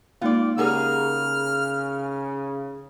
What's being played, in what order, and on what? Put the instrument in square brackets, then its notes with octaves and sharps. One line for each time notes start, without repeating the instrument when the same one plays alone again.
[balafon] G#3 A#3 D#4 [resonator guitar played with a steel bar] F4 D5
[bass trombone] C#3 [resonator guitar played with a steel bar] D#4 G#4 A#4 [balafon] G4 F#5 [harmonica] F6